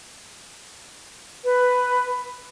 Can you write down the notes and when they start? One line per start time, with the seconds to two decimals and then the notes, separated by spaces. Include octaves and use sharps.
1.44 B4